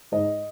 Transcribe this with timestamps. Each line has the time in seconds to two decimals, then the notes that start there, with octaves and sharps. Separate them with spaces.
0.12 G#2 D#5